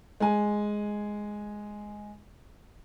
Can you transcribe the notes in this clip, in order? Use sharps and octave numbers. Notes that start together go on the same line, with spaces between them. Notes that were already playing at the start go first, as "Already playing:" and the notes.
G#3 G#5